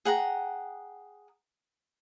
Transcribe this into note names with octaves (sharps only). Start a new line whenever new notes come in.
G#4 F#5 G5 A#5